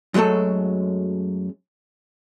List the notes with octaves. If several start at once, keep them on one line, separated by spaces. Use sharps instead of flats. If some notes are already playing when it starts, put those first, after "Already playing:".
F#2 F#3 G#3 A3 A4